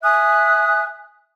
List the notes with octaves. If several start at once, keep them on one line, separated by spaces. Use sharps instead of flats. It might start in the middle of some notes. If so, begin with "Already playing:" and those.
E5 G#5 D#6 F#6